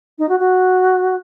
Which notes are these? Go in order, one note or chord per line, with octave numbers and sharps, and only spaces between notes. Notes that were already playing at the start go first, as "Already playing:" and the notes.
D#4
F#4
F#4